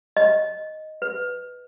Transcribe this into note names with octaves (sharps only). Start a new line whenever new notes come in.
D#5
B4